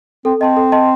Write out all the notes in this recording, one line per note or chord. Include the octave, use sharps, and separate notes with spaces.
C4 A4
C4 D#5 A5 C6
A4
D#5 A5 C6